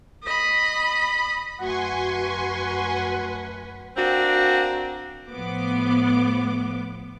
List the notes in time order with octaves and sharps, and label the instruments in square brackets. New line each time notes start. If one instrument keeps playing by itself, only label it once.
[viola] D#5 B5
[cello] F#2 B4 [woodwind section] A3 F#5 [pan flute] F#4 [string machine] G#5 C6 C#6
[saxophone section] A#3 C4 D4 F#4
[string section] A2 F3 B3 D6